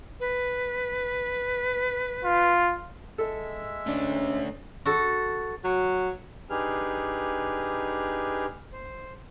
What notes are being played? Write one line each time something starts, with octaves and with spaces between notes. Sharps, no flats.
B4
F4
G#3 A4 E5 E6
A3 C#4 D4
F#4 A4
F#3
D4 D#4 G4 G#4 B4 F6
C5